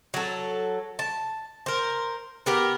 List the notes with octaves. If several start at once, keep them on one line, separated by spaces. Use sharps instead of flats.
F#3 A4
A5
A#4 C5
B3 G4 A#4